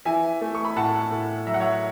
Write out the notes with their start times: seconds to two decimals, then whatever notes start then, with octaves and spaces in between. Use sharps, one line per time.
0.05 E3 E5 G#5
0.41 A3
0.55 C#6
0.65 B5
0.76 A2 F#5 A5
1.11 A2
1.47 F#3 E5
1.54 F#5
1.60 C#5 E5